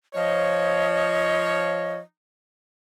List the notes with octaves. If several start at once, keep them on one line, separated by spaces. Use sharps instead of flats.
F3 C#5 D#5